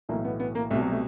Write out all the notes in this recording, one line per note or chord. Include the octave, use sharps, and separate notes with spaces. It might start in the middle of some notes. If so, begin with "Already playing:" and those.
B1 A2 E3 A#3
B3
B3
A#3
C2 B2 A3
F#3
A3